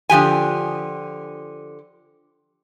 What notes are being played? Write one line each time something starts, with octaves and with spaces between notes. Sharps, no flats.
D3 F3 G4 G#5